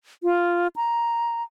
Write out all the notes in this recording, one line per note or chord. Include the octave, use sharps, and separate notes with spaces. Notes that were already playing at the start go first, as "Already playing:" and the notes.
F4
A#5